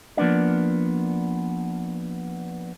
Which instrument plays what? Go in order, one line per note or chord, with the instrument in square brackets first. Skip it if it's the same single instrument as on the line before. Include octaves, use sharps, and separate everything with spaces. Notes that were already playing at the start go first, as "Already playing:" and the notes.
[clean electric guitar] F3 A#3 B3 D4 D5